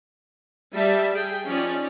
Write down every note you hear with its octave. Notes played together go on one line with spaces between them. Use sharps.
G3 E5 A5
G#4 G5
F3 C#4 D#4 D5